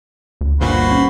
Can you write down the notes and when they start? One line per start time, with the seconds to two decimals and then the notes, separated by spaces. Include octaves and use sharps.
0.41 D2
0.61 G1 G2 A#2 F#4 B4 C5
0.92 C#4